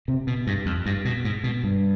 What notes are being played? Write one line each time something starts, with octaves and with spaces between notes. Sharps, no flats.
C3
B2
G2
F2
G2
B2
G#2
B2
G2